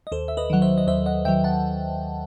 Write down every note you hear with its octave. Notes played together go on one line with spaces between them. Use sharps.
D#5
D#2 A4 C5
E5
B4 D#5
D#3 F#3 F#5
C5 E5
D#5
D#2 C5 E5
D#5 F#5
D#3 F#3 E5 G5
F#5 A5